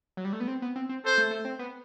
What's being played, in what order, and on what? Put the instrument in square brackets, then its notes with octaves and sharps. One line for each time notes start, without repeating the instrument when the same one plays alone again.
[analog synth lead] F#3
G3
A3
B3
C4
B3
C4
C4
[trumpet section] A4 C5
[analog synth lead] A3
A3
C4
B3